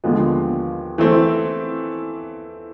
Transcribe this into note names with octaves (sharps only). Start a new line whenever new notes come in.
D#2 D3 F3 G#3 B3
E3 A3 C4